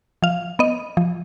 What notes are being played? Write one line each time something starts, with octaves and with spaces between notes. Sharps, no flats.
F3 F5
B3 D#5
F3